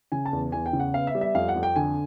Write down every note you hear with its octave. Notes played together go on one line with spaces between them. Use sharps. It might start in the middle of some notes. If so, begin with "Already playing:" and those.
C#3 G#5
A5
E2
E2 G#5
G5
C#3
F#5
B3 F5
E5
G3
E5
F2 F5
F#5
F2
G5
D3 G#5